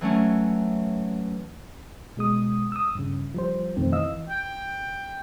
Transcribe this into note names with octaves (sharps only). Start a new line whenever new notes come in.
E3 F#3 A3 C#4
B2 G#3 D#6
D#6 E6
G2 C#3
F3 G3 C5
F2 B2 D#3 A3 C4
E3 D#5 F5 E6
G5